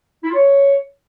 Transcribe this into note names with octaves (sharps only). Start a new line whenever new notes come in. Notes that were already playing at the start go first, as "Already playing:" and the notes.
E4
F4
C#5